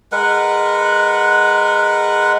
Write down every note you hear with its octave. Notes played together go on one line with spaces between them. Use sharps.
G#3 A#4 B4 F#5